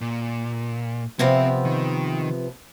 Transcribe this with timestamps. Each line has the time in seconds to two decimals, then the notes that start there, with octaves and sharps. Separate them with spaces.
0.01 A#2
1.19 C3 F3 B3 C4
1.65 D#3